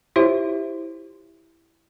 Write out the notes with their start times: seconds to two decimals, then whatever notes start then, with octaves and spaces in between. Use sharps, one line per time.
0.16 E4 F4 G4 C5 C#5 E5